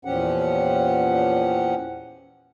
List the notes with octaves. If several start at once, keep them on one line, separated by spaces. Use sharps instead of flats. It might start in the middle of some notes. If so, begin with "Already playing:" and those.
E2 A#2 F3 C#4 G4 F#5